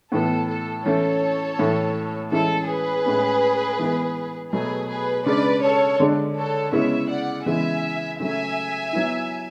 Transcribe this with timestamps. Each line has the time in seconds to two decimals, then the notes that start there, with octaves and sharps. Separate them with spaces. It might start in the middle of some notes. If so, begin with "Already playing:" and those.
0.12 A2 E3 B3 A4
0.49 A4
0.85 E3 A3 C#4 E4 A4 C#5
1.59 A2 E3 A3
2.32 E3 G#3 C#4 E4 A4
2.69 G#4 B4
3.06 A2 G#3 C#4
3.79 E3 G#3 B3
4.52 B2 F#3 A3 G#4 B4
4.89 G#4 B4
5.26 C#3 G#3 D4 B4 D5
5.63 A4 C#5
6.00 D3 G#3 D4
6.36 A4 C#5
6.72 C#3 G#3 B3 E4 C#5 E5
7.09 D5 F#5
7.46 C#3 E3 G#3 B3 E5 G#5
8.20 C#3 F#3 A3 E5 G#5
8.93 F#3 B3 E4